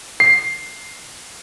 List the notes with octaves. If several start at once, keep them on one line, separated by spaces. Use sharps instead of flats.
C7